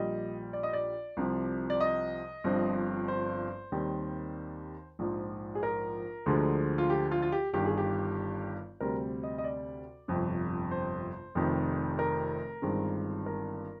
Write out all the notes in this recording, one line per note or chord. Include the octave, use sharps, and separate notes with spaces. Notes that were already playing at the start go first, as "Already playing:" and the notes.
Already playing: A#1 A#2 G3 D#5
D5
D#5
D5
C2 C3 F3
D5
D#5
G1 G2 F3 C4
C5
D#2 D#3 G3 C4
A#1 G#2 F3
G#4
A#4
D2 D3 F3 G#3
F4
G4
F4
F4
G4
G1 G2 D#3 G4
G#4
G4
D2 C3 G3 C4 A#4
D#5
D#5
D5
G1 F2 C3
C5
F1 F2 C3 D#3
A#4
G1 G2 D#3 G#3 C4
A#4